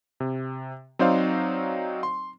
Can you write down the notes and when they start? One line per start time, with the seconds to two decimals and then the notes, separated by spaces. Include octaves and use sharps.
0.20 C3
0.99 F#3 C4 D#4 C5 D5 F5
2.03 C6